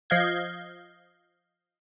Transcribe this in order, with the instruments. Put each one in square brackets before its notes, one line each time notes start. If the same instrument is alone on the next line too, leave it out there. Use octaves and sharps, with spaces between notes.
[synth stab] F3 D#5 F5 G6 G#6